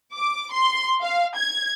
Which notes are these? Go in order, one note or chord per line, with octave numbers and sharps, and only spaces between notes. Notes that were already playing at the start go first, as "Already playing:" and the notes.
D6
C6
F5
G#6